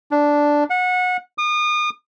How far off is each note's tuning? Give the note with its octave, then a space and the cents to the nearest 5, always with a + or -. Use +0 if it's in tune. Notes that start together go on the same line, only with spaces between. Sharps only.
D4 -5
F#5 -25
D#6 -35